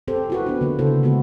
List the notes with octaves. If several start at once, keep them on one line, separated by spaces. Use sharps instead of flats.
C4 G4 A4 C5
E4 F#4 B4
B3 D4
D3 A#3
C#3 E4 A4 C5
C#3 G#3 B3 F#4